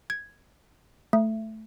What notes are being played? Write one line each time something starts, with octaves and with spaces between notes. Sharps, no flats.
G#6
A3